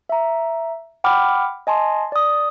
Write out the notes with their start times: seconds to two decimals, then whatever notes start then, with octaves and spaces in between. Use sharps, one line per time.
0.09 E5 A#5
1.04 F#5 G5 B5 D6 F6
1.67 D#5 G#5 A5 C6
2.12 D5 D#6